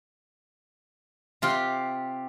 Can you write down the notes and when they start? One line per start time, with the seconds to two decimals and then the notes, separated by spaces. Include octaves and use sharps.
1.42 C3 F4 G4 F#5